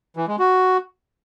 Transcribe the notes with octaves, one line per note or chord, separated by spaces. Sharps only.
E3
G#3
F#4